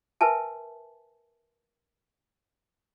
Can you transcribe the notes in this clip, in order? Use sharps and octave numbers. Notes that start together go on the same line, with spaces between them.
A#4 B4 E5 G#5 A5